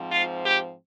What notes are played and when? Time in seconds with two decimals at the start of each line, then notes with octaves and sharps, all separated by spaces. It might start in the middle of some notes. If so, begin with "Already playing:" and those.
Already playing: G#2 F3 C4
0.11 F4
0.45 G4